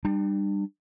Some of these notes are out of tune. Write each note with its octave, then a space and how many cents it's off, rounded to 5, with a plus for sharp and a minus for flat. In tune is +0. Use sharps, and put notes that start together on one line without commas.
G3 +10 D4 +35